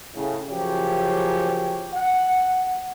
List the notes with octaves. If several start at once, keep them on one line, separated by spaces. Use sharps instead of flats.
A2 C#3
F#2 C#3 F3 G4 C#5
F#5